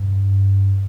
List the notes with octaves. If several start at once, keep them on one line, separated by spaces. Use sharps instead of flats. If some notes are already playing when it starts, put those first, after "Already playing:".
Already playing: G2